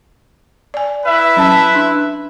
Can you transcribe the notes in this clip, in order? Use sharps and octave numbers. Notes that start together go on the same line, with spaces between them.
D5 G#5
E4 B4 E5
F#3 C#4 A5
D4